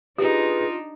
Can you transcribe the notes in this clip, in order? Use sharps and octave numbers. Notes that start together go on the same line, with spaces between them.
D4 D#4 F4 G4 G#4 B4